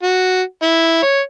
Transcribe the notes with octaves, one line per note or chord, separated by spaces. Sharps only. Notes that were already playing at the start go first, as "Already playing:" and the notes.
F#4
E4
C#5